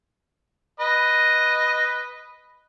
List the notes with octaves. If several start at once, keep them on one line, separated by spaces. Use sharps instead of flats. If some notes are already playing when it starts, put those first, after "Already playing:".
B4 D#5